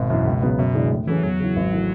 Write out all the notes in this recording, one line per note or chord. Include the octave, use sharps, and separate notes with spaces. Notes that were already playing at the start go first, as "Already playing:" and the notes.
Already playing: G#1 B2
F#2 E3
C#2
C#3 F#3 B3
F#2 B2
C#3 E3 G#3 D4
A2
E3 F#3 A3 C#4 G#4
E2 F#3
C#3 E3
G#1
E3 A3